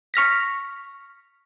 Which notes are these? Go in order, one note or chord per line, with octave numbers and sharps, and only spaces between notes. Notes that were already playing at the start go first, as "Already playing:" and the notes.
C#6 F6 A#6 B6